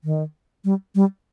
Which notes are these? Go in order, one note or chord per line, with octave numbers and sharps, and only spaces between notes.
D#3
G3
G3